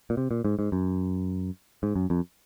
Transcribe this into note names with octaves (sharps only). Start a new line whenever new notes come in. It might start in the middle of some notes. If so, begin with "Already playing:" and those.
A#2
C3
A#2
G#2
G#2
F#2
G#2
F#2
F2